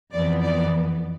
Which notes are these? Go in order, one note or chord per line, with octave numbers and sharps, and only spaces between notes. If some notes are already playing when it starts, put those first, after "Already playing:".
F2 E3 B3 D5
D5